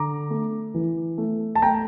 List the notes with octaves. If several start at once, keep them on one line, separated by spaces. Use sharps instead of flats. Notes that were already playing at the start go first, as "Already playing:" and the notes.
Already playing: D3 A#5 D6
A3
E3
A3
A5
A3 G5 A#5